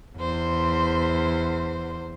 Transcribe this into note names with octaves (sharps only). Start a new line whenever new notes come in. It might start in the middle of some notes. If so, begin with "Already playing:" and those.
E2 C5